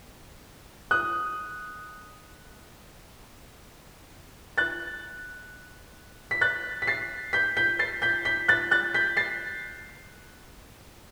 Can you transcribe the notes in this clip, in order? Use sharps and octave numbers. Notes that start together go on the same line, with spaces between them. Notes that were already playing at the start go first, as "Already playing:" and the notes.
D#6 F#6
F#6 A6
B6
F#6 A6
B6
A6 C7
G6 B6
G6 B6
A6 C7
G6 B6
G6 B6
F#6 A6
F#6 A6
G6 B6
A6 C7